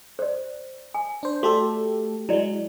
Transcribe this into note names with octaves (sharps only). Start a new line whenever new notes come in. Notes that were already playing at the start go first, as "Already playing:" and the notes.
C5 D5
G#5
D4 C5
A3 F#4 G4 A4 D5
F#3 G#3 E4 D5